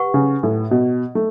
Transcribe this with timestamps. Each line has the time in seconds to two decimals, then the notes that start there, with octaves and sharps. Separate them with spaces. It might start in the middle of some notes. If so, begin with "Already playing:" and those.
Already playing: G4 B4 F#5 C#6
0.14 C#3
0.43 A2
0.71 B2
1.15 A3